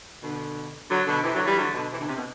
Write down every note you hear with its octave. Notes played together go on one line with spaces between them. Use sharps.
B2 D3
D3 F#3
B2 D3
C3 E3
D3 F#3
E3 G3
D3 F#3
B2 D3
C3 E3
B2 D3
C3
B2